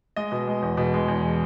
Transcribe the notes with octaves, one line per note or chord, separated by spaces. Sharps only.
G#3 D#5
B2
G#3
E2
B2
G#3
E2